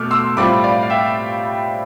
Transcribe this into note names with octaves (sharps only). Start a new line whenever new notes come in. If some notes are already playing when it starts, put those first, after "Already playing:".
Already playing: B2 A3 D6 F6
C6 E6
A2 G3 C4 F4 B5 D6
D5 F5
F5
E5 G5